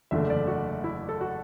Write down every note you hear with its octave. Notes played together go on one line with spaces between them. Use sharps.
F#1 E2 D3 A3 D4 E5
D5
F#4
E4
A4
F#4